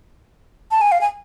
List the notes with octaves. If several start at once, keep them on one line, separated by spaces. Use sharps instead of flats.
A5
G#5
F5
G#5